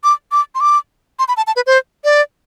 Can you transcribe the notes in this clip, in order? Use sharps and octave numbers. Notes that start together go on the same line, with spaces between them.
D6
D6
C6
D6
C6
B5
A5
A5
B4
C5
D5